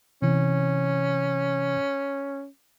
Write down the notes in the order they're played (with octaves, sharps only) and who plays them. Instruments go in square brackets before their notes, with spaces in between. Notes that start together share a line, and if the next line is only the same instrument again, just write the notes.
[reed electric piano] C3 E3 [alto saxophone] C#4